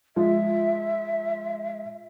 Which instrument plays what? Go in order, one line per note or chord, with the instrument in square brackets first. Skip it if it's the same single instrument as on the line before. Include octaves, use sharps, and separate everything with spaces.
[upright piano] F3 G#3 F4 [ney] E5